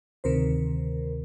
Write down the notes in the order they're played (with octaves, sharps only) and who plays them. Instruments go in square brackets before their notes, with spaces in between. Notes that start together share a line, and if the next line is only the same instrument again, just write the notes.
[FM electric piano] D2 C3 D#3 A#4 C5